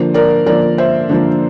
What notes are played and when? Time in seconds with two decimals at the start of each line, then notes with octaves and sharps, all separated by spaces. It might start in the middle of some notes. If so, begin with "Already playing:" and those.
Already playing: D3 F3 A#3 D4
0.14 A#4 D5
0.46 D3 F3 A#3 D4 A#4 D5
0.78 C5 E5
1.10 D3 F3 A#3 D4